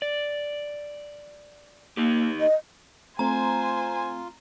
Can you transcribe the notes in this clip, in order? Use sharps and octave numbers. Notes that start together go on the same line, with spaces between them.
D5
A#3 D#4 G4
D#5
A3 C4 F4 C5 G#5 A#5